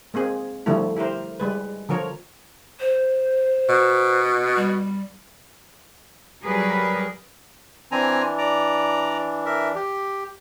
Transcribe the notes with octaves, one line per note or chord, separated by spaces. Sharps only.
G#3 A#3 C4 G#4
D3 F3 G3 A3 E4
E4 G4 A#4 C5
G3 G#3 B4
D3 F3 A#4 C#5
C5
B2
G3
F#3 G3 G#4 A#4 B4
E3 C4 D4 G#5 A#5
D5 A#5
A#4 E5
G4